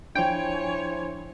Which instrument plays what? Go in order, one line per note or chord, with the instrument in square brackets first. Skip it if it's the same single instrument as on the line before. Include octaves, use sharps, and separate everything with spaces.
[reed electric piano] F3 D4 [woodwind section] E4 C5 G#5 [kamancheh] C#5 [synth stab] G5